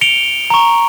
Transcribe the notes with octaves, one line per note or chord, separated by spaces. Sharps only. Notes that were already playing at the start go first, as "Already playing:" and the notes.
C#7 D7 F7 G7
A#5 C#6